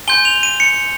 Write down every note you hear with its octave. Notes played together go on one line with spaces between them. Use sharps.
G#5 C6 G6 G7
F7
D#7
C#7